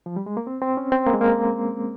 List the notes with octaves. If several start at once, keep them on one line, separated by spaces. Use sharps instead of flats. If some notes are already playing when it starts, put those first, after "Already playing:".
F3
G3
G#3
A#3
C4
C4
C#4
C4
A#3
G#3
A#3